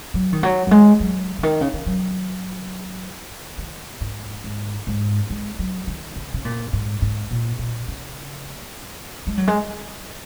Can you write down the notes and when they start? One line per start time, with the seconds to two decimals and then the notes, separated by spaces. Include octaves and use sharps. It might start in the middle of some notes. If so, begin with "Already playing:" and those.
0.14 F#3
0.33 D#3
0.43 F#3
0.67 F#3
0.71 G#3
1.00 F#3
1.39 C#3
1.43 D#3
1.61 C#3
1.73 D#3
1.86 F#3
3.58 D#3
4.01 G#2
4.44 G#2
4.87 G#2
5.30 G#3
5.59 F#3
5.87 D#3
6.16 C#3
6.34 C#3
6.45 A#2
6.73 G#2
7.02 G#2
7.31 A#2
7.59 A#2
7.88 C#3
9.27 G#3
9.38 F#3
9.48 G#3